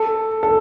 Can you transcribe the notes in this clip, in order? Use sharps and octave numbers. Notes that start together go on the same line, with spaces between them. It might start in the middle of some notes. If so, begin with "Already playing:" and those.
Already playing: A4
A4